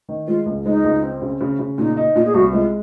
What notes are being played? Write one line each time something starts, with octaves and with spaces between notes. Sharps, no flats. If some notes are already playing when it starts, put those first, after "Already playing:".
D#3
G#3 F4
C#2
G#3 D#4
C#2
C4
C#3
C#3
C#3
A#2 D#4
D#4
A#2 F4
G#4
C2 F#4
G#3 F4